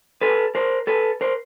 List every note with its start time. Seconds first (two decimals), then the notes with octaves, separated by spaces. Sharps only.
0.21 A4 B4
0.55 A#4 C5
0.87 A4 B4
1.21 A#4 C5